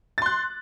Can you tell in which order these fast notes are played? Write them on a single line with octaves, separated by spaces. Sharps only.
A6 C6 F#6